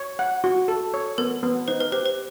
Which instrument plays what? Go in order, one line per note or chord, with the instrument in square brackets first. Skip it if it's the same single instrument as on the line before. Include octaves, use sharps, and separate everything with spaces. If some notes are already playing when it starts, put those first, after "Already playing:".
Already playing: [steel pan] C#5
F#5
F#4
A4
C#5
[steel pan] B3 [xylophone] A#4
[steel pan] B3
[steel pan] D#4 [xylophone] C5
[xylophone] B4
[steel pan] G4 [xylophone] C5
[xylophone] C5